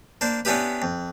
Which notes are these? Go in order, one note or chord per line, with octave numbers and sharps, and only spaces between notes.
A#3 D4 C5
B3 C#4 D4 E4 G4 B4
F2